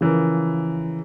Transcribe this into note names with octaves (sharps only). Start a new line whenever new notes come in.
C#3 E3 F3 A#4